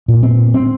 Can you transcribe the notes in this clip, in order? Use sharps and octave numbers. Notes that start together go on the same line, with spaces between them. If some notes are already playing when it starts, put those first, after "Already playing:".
A#2
C4
C4